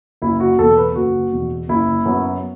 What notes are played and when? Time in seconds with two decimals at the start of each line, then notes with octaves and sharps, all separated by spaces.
0.22 F#1 E4
0.40 F#4
0.58 E2 B2 A4
0.77 B4
0.95 F#1 F#4
1.32 E2 B2
1.69 F#1 E4
2.06 F#2 F#3 B3